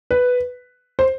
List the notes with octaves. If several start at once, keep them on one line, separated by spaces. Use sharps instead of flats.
B4
C5